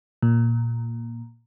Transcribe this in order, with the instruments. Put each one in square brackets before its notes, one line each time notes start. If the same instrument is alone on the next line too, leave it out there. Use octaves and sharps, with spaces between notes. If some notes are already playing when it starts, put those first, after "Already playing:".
[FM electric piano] A#2